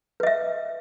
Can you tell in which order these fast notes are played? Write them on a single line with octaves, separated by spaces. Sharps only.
B4 D#5 E5